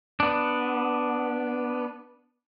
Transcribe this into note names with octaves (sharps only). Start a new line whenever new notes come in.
B3 D4